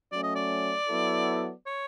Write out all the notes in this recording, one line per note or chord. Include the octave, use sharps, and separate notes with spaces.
F#3 A3 C#4 D5
D#5
D5
F#3 B3 E4 A4
C#5